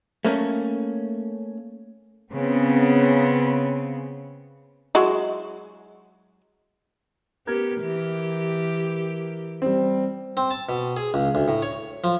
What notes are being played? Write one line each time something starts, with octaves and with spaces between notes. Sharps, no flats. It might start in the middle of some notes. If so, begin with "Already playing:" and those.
A3 A#3 C#4
C#3 B3 C4
F#3 G#3 E4
B3 G4 A#4 G#6
E3 G4
G3 C4
C4
A5
B2
G#4
C#2
D2
A2
C#5
F3